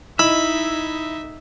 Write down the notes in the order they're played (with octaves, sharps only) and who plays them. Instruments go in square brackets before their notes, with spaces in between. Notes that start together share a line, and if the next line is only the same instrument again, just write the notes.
[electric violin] D#4 E5 [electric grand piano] E4 D#5 [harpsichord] B5 [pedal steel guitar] E6